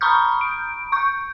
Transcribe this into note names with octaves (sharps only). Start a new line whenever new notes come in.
A#5 B5 C#6 D#6 F6 G6
D7
C#6 G6